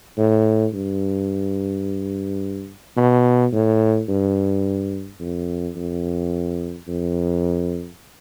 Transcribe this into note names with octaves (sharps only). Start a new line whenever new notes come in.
A2
G2
B2
A2
G2
F2
F2
F2